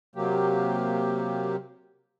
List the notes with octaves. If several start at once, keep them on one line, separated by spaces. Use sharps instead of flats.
C3 F#3 A#3 G4